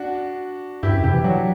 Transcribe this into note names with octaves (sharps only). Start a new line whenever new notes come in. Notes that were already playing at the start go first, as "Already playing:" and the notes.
Already playing: D4 F#4
G2 E4 G4
F#2
C3 E4 G4
E3
F#3 D4 F#4